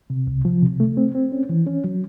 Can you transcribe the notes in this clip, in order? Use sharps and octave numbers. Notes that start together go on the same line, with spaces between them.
C3
C2
F3
C3
A3
C4
C4
C#4
E3
C#4
F#3